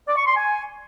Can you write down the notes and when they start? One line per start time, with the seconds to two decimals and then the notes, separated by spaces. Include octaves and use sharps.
0.07 D5
0.16 C#6
0.26 C6
0.35 G#5